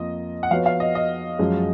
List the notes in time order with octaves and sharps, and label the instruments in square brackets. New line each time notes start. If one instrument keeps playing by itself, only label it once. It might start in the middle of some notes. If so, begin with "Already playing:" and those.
Already playing: [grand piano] F2 F3 A#3 F4 A#4 [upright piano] D#5
[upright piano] F#5
[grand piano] F3 B3 F#4 C#5 [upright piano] F5
[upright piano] F5
D#5
D#5
[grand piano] F#2 F3 G#3 C#4